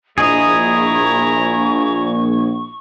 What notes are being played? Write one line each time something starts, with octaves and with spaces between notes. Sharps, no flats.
A#1 E4 G#4 D#5 A#5 C#6